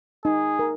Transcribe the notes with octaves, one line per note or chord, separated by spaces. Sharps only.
D#4 G#4
A#4